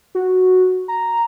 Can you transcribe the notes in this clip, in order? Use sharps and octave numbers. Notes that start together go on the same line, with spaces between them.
F#4
A#5